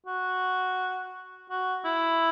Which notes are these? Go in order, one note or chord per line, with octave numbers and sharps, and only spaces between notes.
F#4
F#4
E4